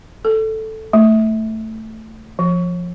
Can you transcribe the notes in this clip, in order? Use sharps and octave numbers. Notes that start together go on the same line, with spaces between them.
A4
A3
F3